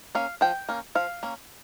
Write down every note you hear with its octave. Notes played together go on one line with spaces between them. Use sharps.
A#3 C#4 F5
F3 G5
A#3 C#4
F3 F5
A#3 C#4